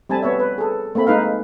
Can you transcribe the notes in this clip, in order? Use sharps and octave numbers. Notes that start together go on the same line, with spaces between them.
G3 A3 C4 G#5 A5 B5
B3 C#5 E5
B4
G#4 A4
A3 A#3 C4 B5
G#3 D#4 B4 F5